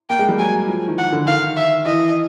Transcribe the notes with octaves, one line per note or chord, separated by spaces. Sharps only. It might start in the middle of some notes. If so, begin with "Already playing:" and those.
A#3 G5
G#3
G3
F#3 G#5
F3
D#3
D#3 F#5
D3
D#3 F5
E5
E3 D#5